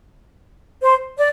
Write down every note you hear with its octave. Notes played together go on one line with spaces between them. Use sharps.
C5
D5